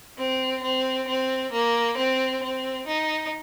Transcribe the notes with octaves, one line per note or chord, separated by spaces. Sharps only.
C4
C4
C4
A#3
C4
C4
D#4